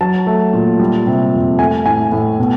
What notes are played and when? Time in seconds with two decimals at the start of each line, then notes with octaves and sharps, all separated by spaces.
0.01 F#3 A5
0.27 A3
0.53 A#2
0.79 G3
1.07 C3
1.34 F2
1.59 A3 G#5
1.86 A2 G#5
2.12 A2
2.39 B2